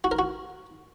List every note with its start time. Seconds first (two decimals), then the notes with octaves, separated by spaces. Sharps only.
0.04 F#4
0.11 A#4
0.19 F#4